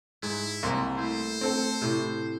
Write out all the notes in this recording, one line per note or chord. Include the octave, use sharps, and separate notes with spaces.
G#2 E4
C2 A#3 C6
A3 E4 C5
C4 A4
A2 C3